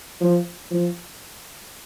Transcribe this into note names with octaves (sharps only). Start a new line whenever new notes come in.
F3
F3